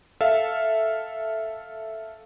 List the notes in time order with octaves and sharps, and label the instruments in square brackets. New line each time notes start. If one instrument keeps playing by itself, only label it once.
[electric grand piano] A4 E5 F5